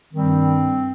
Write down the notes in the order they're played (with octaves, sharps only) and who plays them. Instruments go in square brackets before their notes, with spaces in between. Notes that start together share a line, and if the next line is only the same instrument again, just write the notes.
[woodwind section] G2 D#3 G3 C4